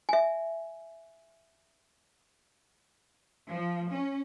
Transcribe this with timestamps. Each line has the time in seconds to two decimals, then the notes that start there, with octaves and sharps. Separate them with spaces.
0.09 E5 G#5
3.51 F3
3.92 C#4